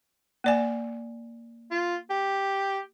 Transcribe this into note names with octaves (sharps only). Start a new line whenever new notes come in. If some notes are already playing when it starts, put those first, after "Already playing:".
A#3 D5 G#5
F4
G4